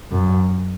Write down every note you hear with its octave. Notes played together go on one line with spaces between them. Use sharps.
F#2